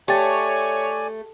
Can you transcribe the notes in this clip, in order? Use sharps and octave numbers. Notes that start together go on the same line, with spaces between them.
A3 G4 C#5 D5 G5 G#5 A6